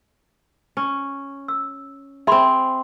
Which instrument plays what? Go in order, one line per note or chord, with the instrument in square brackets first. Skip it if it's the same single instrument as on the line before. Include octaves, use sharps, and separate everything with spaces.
[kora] C#4
[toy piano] E6
[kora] C4 G#4 [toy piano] E5 B5 C6